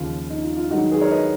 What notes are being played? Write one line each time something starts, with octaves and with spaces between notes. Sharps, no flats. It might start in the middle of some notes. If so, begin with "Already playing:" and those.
Already playing: D#2 C#3 F3 F4
D#4
F4
F4
G#2 D#3 F#3 D#4 F#4
G#4 B4
A#4 C#5
B4 D#5